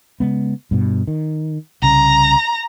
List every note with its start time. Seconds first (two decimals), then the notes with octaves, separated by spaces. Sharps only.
0.20 C#3 G#3 B3
0.71 G2 B2
1.07 D#3
1.82 C2 C#3 A#5